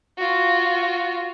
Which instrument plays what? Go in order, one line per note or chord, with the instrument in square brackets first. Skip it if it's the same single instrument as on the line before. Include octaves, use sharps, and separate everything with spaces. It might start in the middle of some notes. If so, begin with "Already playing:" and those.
[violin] F4 F#4